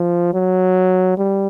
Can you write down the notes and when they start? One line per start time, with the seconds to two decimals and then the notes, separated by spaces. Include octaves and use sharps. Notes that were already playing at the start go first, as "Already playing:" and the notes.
Already playing: F3
0.34 F#3
1.18 G3